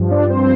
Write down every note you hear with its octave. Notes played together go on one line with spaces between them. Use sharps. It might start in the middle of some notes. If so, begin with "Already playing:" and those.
Already playing: G2 F3
D4 D5
C4 C5